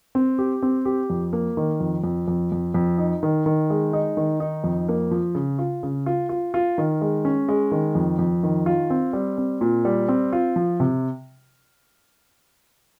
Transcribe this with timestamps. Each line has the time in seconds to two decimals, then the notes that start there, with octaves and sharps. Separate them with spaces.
0.15 C4
0.38 G4
0.62 C4
0.85 G4
1.10 F2
1.33 A#3
1.57 D#3
1.80 F2
2.04 F2
2.28 F2
2.52 F2
2.74 F2
2.98 D#4
3.23 D#3
3.46 D#3
3.70 G#3
3.93 D#4
4.17 D#3
4.40 D#4
4.64 F2
4.89 A#3
5.11 F3
5.35 C#3
5.59 F4
5.83 C#3
6.06 F4
6.29 F4
6.54 F4
6.78 D#3
7.01 G#3
7.25 C#4
7.49 G#3
7.71 D#3
7.95 F2
8.19 F2
8.43 D#3
8.66 F4
8.90 C4
9.13 G3
9.38 C4
9.61 A#2
9.85 G3
10.08 C4
10.33 F4
10.56 F3
10.80 C3